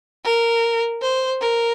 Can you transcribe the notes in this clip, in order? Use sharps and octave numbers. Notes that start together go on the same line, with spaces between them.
A#4
C5
A#4